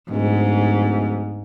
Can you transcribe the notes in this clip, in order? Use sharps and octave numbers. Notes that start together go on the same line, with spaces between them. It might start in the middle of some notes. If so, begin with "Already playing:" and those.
D1 G#2